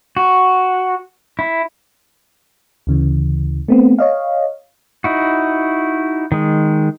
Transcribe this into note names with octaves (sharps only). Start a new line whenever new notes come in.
F#4
E4
D2 C#3 E3
A3 B3 C4
C#5 D#5 F5
D#4 E4 F#4
D#3 G#3